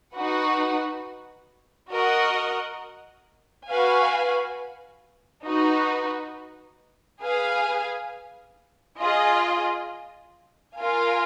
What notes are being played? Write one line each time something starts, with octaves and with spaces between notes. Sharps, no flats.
D#4 F#4 B4 F#5
F#4 A#4 D#5 F#5
F#4 B4 F5 G#5
D#4 F#4 B4
G#4 B4 F5 G#5
F4 G#4 D#5
F4 A#4 F5 G#5